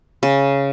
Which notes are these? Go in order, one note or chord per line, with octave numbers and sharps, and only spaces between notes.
C#3